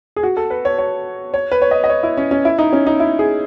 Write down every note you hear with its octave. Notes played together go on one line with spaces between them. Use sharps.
G#4
F#4
A4
B4
C#5
C#5
C#5
B4
C#5
D#5
D#5
C#5
E4
C#4
C#4
E4
D#4
C#4
D#4
E4
G#4